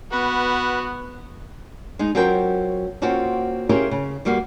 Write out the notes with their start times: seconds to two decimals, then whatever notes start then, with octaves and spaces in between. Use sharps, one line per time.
0.12 B3 F#4 B4
1.99 G#3 D#4
2.15 F#3 C4 C#4 F4 A#4 G5
3.02 A#3 C4 C#4 F4 F#4
3.69 C#4 E4 F4 G4 G#4 A#4
3.91 C#3
4.25 E2 G3 A#3 F#4 F5